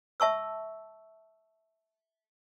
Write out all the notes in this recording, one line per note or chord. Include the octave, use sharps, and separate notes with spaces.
E5 A5 C#6 E6